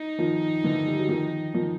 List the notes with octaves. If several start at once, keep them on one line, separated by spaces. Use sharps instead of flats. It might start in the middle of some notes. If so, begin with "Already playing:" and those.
Already playing: D#4
D#3 F3
D3 E3
G3
F#3
D#3 F3
D#3 F3